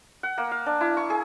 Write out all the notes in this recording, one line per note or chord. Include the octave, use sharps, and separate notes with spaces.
F#5
A#3
F5
D4
E4
C#6
G#4